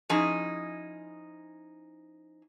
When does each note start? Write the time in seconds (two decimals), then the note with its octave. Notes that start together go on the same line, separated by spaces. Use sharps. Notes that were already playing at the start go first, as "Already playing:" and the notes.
0.09 F3 C#4 D#4 E4 G#4